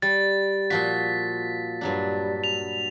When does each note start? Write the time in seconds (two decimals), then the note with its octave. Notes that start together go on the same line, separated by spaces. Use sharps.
0.02 G3 A6
0.70 A#2 F3 F#4 B6
1.81 G2 F#3 D4
2.44 F7